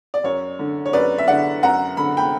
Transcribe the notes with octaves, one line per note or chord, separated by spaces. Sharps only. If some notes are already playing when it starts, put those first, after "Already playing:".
D5
F#2 C#5
D3
C#5
F#2 B4 D5
E5
D3 D5 F#5
F#2 F#5 A#5
D3 B5
G5 B5